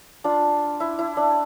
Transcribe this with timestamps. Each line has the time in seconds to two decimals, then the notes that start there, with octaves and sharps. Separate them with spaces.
0.24 D4 F4
0.80 E4
0.99 E4
1.17 D4